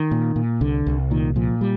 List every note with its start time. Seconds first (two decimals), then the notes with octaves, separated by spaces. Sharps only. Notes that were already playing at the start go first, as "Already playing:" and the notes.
Already playing: D#3
0.11 A#2
0.36 A#2
0.61 C2 D3
0.86 C2
1.11 A#2 D#3
1.36 A#2 F3
1.61 G3